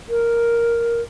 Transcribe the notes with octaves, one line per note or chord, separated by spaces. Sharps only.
A#4